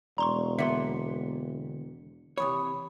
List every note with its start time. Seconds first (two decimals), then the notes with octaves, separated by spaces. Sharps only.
0.18 E1 D5 A#5 C6 C#6
0.59 D3 A#3 B3 E5 C6 C#7
2.38 C3 E3 C#5 B5 C#6 D#6